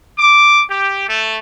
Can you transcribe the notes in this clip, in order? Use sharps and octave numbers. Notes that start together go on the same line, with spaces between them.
D6
G4
A3